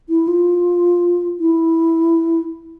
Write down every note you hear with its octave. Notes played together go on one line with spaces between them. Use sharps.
E4
F4
E4